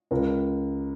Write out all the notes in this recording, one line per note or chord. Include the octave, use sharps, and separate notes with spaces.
C#2 A#4